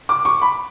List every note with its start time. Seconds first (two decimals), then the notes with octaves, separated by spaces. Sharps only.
0.09 D6
0.25 C#6
0.42 B5